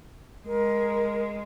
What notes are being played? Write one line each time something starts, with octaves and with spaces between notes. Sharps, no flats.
G#3 A#4